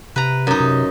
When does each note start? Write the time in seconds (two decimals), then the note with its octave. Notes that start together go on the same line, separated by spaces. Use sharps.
0.16 C3 B4 A#5
0.47 F#2 D#4
0.60 C3